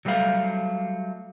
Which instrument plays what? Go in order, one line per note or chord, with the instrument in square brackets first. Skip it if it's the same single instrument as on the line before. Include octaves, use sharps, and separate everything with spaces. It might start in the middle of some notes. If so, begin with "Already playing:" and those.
[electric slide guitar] F#3 G3 A3 B4 F5